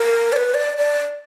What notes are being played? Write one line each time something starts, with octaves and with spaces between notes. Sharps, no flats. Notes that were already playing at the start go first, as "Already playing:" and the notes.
Already playing: A#4
D5
B4
D5
D5